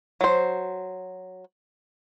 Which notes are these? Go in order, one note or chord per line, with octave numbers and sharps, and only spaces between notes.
F#3 C5